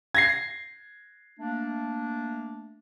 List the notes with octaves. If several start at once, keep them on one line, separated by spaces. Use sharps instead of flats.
G#6 A#6 C7
A3 A#3 D4